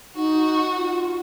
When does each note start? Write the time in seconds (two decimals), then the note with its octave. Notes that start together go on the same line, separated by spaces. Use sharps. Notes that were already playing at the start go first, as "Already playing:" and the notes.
0.16 D#4 F#4
0.76 F4